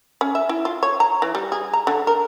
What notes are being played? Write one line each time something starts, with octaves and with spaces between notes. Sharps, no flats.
C#4
E5
E4
F4
C#5
A#5
E3
G3
G#4
A#5
D3
A#4